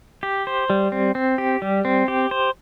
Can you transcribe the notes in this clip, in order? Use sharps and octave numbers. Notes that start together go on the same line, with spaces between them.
G4
C5
G3
C4
C4
G4
G3
C4
G4
C5